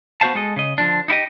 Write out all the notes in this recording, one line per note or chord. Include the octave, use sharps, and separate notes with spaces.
B3 F#4 G#4 C5 F5 A5
G#3 A4 D#5
C#3 D#5
D3 F3 D4
D#4 E4 G4 D#5